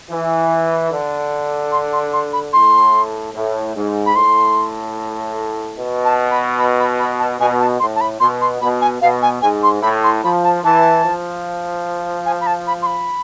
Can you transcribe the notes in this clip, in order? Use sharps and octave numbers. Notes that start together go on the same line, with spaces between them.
E3
D3
C6
C6
C6
B5
A2 C6
A2
G#2
B5
A2 C6
B2
A5
B5
B5
B5
B5
A5
B2 G#5
A5
A2 C6
A5
B5
B2 C6
C6
B2 B5
G#5
B2 F5
G#5
G#2 G#5
C6
A2 B5
C6
F3 B5
A5
E3 A5
F3
G#5
B5
A5
B5
C6
B5